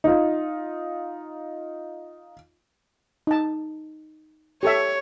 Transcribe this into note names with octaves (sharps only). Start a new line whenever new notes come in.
D#4 F4
D#4 A5
G4 A4 C#5 E5